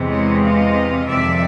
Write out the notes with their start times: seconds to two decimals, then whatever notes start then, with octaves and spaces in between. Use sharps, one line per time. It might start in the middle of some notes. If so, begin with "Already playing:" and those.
Already playing: E2 C3 E3 G#3
0.10 C#5 D#5
0.43 D#5 F5
1.08 F2 C3 D#3 D5 E5